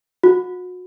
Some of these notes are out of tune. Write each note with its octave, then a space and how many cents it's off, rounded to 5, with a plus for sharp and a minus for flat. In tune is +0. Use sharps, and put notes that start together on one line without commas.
F#4 -35